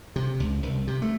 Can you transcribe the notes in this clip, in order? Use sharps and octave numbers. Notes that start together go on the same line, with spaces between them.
C3
C#2
C2
C3
A3